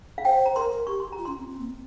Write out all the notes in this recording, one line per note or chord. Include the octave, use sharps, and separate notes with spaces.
F5
C5 G5
A#5
A#4 C6
A#4
G4 C#6
C6
A#5
F4
C#4 C6
C4
C4
A#3
C4